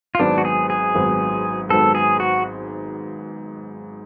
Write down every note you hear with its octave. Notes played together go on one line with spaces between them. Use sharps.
F4
G#1 G#2 F#3 B3 D4
F#4
G#4
G#4
G#1 G#2 F#3 B3
G#1 G#2 F#3 B3 A4
G#4
F#4